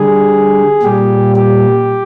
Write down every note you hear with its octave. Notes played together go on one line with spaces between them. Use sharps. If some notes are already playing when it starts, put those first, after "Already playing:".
Already playing: D3 G3 G#4
A#2 G3 G4
G4